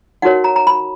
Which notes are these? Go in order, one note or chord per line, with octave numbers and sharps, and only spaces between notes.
D#4 F#4 A#4 C#5 F#5
A#5
A#5
B5